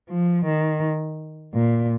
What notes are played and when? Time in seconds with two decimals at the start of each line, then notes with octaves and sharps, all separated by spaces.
0.09 F3
0.45 D#3
1.54 A#2